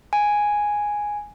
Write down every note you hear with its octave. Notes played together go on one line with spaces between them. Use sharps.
G#5